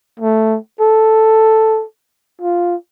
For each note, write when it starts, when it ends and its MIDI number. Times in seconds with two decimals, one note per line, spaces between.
0.20 0.58 57
0.81 1.84 69
2.41 2.75 65